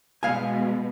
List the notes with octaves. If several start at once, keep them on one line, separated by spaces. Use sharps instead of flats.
B2 G#3 F5 G#5